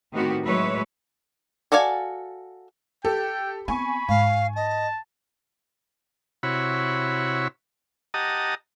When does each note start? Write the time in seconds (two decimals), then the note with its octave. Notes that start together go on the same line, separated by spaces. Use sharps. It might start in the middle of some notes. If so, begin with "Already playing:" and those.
0.12 A2 D#3 B3 C4 F#4 G4
0.44 A2 F#3 G#3 B4 C#5 E5
1.72 F#4 A4 D5 F5 G#5
3.05 G4 A4 G5
3.68 B3 C4 G#5 B5 C#6
4.09 G#2 F5
4.56 D#5 A5
6.43 C3 E4 F#4 C#5 B5
8.14 G4 D#5 F#5 A5 A#5 D#6